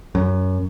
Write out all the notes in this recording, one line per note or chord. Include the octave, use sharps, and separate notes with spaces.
F#2